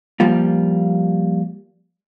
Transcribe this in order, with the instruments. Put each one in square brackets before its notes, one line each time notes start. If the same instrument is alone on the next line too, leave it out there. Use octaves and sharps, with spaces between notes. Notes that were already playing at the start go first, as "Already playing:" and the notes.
[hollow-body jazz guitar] F3 G3 A#3 F4